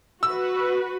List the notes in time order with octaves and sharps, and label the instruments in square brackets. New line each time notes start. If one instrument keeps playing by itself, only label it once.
[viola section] F#4 B4 [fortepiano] E6